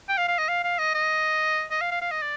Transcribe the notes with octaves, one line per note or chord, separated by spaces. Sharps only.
G5
F5
F5
D#5
F5
F5
D#5
D#5
D#5
F5
F5
F5
D#5
D5